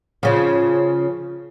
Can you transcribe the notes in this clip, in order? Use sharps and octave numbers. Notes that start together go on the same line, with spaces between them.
C#3 F3